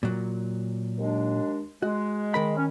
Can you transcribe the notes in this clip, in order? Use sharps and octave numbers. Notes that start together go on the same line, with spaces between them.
A#2 F#3
D#2 G#3 D4
G#3 F#4
D#3 A#4 B5
C#4